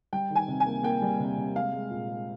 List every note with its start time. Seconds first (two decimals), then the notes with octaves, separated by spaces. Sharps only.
0.13 G3 G5
0.30 D#3
0.35 G#5
0.48 C3
0.60 G#5
0.66 A#3
0.83 A#3 G5
1.02 G3
1.19 C3
1.38 C3
1.55 G#3 F5
1.73 G#3
1.91 A#2
2.10 G#3